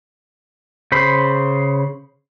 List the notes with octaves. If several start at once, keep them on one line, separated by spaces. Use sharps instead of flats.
C#3 C5 B5